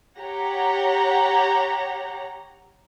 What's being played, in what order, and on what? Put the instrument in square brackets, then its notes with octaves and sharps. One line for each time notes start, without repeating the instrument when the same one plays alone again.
[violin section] G4 C#5 F#5 A#5